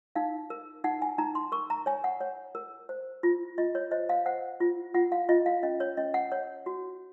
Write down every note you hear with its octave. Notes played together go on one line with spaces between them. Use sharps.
D#4 F5
A#4
D#4 F#5
G#5
D#4 A#5
C6
A#4 C#6
A#5
C#5 G#5
F#5
C#5
A#4
C5
F4
F4 D#5
C#5
C5 D#5
F5
C5 F#5
F4
F4 F#5
F5
F4 D#5
F5
C#4 D#5
C#5
C#4 D#5
F#5
C#5
F#4